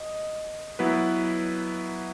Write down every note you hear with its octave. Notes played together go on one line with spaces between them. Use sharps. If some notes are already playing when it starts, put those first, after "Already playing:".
Already playing: D#5
F#3 B3 E4 B4